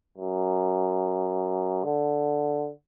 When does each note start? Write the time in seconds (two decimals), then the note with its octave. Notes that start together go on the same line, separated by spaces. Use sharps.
0.18 F#2
1.84 D3